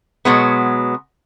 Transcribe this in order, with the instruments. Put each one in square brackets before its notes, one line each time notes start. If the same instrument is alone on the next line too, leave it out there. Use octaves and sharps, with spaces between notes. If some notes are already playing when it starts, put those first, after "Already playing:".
[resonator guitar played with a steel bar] B2 F#3 G#3 B3